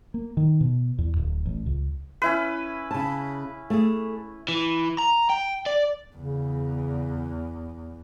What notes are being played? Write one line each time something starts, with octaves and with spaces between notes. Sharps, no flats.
A#3
D#3
B2
E2
D1
A1
C#2
C#4 E4 B4
C#3 A5
A3 G#4
E3
A#5
G5
D5
E2 C#3